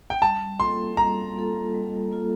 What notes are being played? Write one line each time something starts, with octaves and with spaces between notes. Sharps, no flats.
G5
G3 A5
A#3 F4 A4 C6
G3 A#5
A#3 F4 A4
G3
A#3 F4 A4